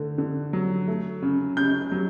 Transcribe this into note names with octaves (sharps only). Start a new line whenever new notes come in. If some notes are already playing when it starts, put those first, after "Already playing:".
Already playing: D3 A3
D3
F#3
A3
C#3
C#3 G6
F#3